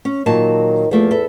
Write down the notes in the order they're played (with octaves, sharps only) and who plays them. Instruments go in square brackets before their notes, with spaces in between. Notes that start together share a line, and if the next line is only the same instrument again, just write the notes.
[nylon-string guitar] C#4
[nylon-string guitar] A#2 F#3 A5 [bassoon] D#3
[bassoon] E2 [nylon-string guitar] F3 A3 A#3
[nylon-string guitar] A4 B4 E5